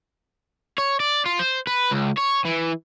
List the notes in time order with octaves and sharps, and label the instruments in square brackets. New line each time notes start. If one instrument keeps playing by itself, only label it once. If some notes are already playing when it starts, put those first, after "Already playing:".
[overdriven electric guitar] C#5
D5
F4
C5
B4
C#2
C#5
E3